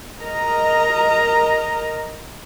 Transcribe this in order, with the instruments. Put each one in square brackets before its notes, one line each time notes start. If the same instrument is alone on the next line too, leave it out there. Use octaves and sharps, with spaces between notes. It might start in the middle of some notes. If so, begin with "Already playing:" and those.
[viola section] A#4 D#5 A#5